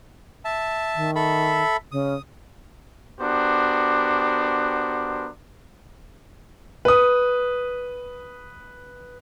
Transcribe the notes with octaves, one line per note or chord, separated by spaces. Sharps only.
E5 A5
D#3
A4 E5 B5
C#3 D#6
B3 D4 F#4 G4 A#4 C5
B4 D#6